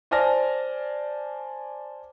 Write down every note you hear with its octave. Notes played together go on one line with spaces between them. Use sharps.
C5 D5 G#5 A5 F6 A#6